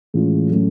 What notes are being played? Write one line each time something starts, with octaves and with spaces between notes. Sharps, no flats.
A2 E3 G#3 C#4 F4
A2 F#3 A3 C#4